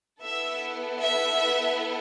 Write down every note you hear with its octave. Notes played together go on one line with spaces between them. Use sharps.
B3 E4 A4 E5
E5